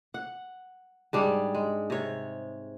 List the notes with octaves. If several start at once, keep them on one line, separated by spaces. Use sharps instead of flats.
F#5
G#2 G3 D4 G#4
G#3
C3 C#5